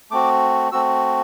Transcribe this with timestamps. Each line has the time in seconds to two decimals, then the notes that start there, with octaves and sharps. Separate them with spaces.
0.11 A3 C4 F#4 D6
0.72 A3 C4 F#4 E6